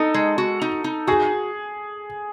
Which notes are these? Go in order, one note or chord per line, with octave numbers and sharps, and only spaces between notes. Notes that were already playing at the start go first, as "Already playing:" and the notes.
Already playing: D#4 A4
G#3
F#4
D#4
D#4
F#4 G#4